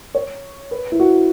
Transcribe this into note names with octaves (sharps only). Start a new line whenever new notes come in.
C#5
B4
E4
F#4